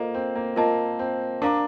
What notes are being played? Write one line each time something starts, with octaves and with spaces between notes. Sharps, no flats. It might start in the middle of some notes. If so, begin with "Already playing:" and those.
Already playing: A#3 F4 A4 C5 D#5
C4
A#3
A#3 F4 A#4 D#5 A5
C4
D4 A#4 F5 A#5 D6